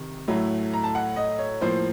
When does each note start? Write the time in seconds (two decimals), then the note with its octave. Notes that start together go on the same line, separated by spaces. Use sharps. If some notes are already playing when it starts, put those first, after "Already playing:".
Already playing: C3 D#3
0.28 A2 F#3 A3
0.73 A#5
0.84 A5
0.95 F#5
1.16 D#5
1.39 C#5
1.61 A2 F3 A#3 C5